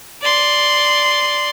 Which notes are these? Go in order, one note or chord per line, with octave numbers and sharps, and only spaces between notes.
D5 C6